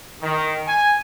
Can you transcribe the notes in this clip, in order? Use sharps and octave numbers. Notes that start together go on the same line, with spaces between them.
D#3
G#5